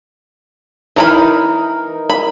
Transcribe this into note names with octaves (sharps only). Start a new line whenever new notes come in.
E3 D#4 A#4 A#5 B5
B5